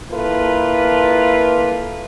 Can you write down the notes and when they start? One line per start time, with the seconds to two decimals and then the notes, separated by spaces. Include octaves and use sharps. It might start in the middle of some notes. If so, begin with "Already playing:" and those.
0.12 A#3 E4 F4 A4 B4